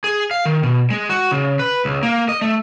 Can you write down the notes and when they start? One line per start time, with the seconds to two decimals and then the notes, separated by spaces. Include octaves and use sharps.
0.04 G#4
0.31 F5
0.45 D#3
0.63 B2
0.90 G#3
1.10 F#4
1.31 C#3
1.59 B4
1.85 C#2
2.03 A#3
2.29 D#5
2.42 A3